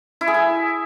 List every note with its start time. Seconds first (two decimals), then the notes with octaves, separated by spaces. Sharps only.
0.21 E4
0.28 G#4
0.34 G#5